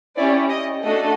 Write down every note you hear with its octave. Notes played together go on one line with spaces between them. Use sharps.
C#4 E4 G4 D5
D#5
A3 D4 F#4 A4 D#5